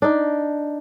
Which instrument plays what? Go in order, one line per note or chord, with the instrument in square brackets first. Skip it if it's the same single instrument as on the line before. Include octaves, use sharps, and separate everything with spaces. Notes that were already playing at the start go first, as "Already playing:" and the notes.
[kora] D4 D#4